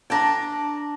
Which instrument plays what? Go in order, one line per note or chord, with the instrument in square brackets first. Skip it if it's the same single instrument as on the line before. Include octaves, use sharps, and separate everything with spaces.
[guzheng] D4 D5 G5 [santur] A5 A#5